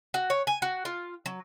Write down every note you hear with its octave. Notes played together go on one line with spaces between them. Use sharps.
F#4
C#5
G#5
F#4
F4
F#3